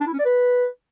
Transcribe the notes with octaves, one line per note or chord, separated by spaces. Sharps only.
D4
E4
C#4
D5
B4